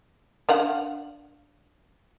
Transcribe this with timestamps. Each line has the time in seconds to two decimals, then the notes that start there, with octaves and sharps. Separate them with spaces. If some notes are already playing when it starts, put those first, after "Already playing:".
0.49 D4 F5 F#5